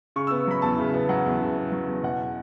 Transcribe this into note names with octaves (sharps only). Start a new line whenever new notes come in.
C#3 C#6
E6
B3
F#3 B5
E2 A5
C#3
B3
F#3 F#5
E2
C#3
B3
F#3
E2
B2 F#5